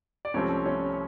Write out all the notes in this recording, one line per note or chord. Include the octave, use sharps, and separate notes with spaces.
D5
C2 C3 F3 A3 C4 C#4 C#5
C#4 C#5